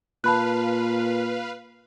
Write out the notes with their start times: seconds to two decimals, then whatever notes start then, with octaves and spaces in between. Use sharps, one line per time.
0.24 A#2 B4 F5 A5 B5 F#6